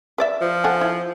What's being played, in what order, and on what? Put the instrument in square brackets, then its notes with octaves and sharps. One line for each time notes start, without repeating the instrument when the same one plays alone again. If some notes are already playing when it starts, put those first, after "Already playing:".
[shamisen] B4 D5 E5
[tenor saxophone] F3
[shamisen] A4 F#5 G#5
E4